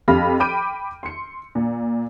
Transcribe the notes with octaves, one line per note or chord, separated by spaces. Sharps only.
F2 G4 F5 B5 F6 A#6
G5 B5 D6 G6 D7 D#7
C6 C#7
A#2